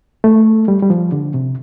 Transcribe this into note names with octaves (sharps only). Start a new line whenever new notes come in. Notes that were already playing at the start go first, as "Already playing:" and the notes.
A3
G3
G3
F3
D3
C3